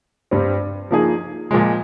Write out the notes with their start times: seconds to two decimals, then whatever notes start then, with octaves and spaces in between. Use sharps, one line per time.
0.31 G2 G3 C4
0.91 F3 A#3 D#4 G#4
1.51 A#2 F3 G#3